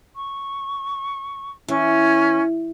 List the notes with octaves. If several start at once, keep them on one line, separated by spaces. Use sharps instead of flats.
C#6
E3 C#4